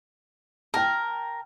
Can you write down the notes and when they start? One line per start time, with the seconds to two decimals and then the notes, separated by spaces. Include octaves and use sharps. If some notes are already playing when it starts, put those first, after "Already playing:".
0.74 A#4 G5 A5